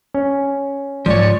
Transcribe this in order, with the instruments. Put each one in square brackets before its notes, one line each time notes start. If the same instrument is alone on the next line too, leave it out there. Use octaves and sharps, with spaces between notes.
[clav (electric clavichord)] C#4
[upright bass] G#2 [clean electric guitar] F3 C#5 [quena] D5